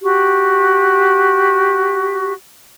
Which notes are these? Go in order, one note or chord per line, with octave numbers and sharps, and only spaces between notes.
F#4 G4